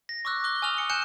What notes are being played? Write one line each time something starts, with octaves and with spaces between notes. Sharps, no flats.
A#6
C#6 D6 E6 F#6
D6 F#6 G7
G#5 D#6 F6 F7 G7
C#7
G#5 F#6 G6 C#7 E7